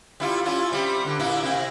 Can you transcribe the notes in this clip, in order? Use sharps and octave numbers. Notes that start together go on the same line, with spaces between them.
G3 E4 F4
C#4 E4 F4
G3 C4
D3
A#2 A#3 E4
C3 E4